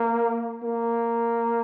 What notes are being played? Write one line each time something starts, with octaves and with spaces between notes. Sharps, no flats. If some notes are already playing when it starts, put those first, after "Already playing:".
Already playing: A#3
A#3